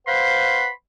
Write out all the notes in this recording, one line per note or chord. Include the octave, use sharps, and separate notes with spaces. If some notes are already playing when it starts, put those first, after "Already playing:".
B4 C5 F5 F#5 B5 C6